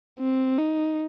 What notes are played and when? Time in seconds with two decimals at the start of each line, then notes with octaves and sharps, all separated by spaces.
0.19 C4
0.59 D#4